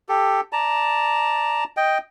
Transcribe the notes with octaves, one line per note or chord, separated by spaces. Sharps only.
G4 A4
D5 A5 A#5
D#5 G5